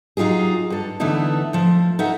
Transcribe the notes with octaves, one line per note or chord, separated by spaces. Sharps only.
F#3 D#4 F4 G4 G#4
G2 A4
D3 E3 A3 B3 D#4 E4
F3 A3
D#4 A4 E5 F#5